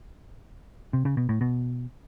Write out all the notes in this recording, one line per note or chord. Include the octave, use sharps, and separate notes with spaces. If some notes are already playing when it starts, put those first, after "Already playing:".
C3
C#3
B2
A2
B2